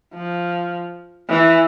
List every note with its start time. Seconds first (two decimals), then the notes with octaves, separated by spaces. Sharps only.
0.14 F3
1.29 E3